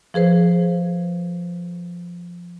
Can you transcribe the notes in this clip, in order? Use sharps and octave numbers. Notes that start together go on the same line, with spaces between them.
F3 G#4 B4 C5